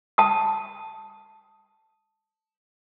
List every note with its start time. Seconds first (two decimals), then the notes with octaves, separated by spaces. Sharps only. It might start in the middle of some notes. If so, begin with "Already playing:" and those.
0.18 A5 D#6